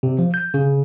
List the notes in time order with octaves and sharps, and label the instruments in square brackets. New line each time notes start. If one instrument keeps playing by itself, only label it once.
[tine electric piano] C3
F3
G6
C#3